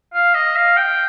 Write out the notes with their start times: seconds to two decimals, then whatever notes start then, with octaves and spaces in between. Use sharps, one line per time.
0.14 F5
0.35 D#5
0.56 F5
0.77 G5